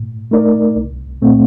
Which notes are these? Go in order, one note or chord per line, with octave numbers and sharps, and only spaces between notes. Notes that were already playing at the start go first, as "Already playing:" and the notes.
Already playing: A2
A3 D#4 A#4 D5
C2
A#2 A3 C4